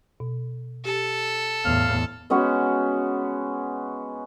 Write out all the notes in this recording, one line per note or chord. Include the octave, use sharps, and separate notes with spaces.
B2
G4 A4
E2 A2 F5
G#3 B3 C#4 F#4